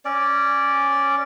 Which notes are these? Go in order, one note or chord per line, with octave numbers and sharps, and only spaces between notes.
C#4 D5